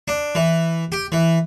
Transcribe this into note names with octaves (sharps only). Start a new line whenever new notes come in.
D4
E3
G4
E3